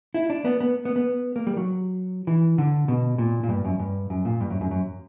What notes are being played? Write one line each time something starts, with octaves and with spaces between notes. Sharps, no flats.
E4
D4
B3
B3
B3
B3
A#3
G3
F#3
E3
D3
B2
A#2
A#2
G2
F#2
G2
F#2
A#2
G2
F#2
F#2
F#2